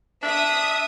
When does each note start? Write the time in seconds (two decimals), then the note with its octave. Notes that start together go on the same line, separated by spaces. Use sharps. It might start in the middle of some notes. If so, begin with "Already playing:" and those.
0.22 D4 E5 D#6